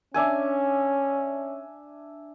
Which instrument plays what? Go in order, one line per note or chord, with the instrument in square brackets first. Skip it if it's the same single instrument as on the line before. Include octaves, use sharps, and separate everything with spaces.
[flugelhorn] C#4 [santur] D4 E5 G#5